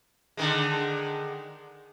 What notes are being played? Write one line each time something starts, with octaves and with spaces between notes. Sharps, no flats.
D3 D#3 G#3